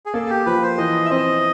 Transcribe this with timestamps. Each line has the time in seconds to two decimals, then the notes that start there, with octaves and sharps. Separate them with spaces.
0.06 G#4
0.14 A#3 A4
0.30 G4
0.46 F3 B4
0.62 C5
0.78 E3 D#5
1.05 E5
1.10 C4 D#5